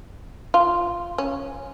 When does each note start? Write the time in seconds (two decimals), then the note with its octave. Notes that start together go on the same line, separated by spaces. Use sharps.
0.54 F4
1.18 C#4